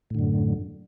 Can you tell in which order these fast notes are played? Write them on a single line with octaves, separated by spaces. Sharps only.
A2 D3 F#2